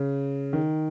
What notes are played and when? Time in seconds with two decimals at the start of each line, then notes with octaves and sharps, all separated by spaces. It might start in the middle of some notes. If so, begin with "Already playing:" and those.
Already playing: C#3
0.53 D#3